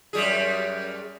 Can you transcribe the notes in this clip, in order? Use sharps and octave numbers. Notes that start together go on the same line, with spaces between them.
F#2 G3 G#4